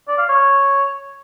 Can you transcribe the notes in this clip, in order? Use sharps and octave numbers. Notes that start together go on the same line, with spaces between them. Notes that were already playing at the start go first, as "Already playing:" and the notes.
D5
F5
C#5